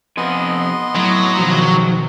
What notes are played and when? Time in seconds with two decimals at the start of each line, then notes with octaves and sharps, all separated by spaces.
0.17 F2 C3 B3 D#5 G#5 C6
0.96 A2 F#3
1.37 B2 D#3 F3 G#3 F#4